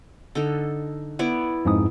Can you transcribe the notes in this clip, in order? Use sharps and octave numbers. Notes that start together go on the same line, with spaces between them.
D3 D#4 A4
B3 E4 D5
F2 G#2 D#6